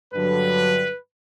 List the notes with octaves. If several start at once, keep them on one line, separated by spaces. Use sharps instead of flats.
G2 D3 F#3 B4